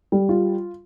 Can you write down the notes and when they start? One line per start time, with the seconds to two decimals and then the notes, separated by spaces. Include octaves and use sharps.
0.12 G3
0.29 F4